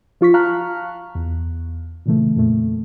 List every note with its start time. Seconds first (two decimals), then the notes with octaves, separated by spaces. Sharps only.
0.21 F3 F4 C#6 B6
0.34 F5 A5 A#5 C#6 F6 F#6
1.15 E2
2.06 A#2 C#3 E3 A3
2.36 F2 A#2 A3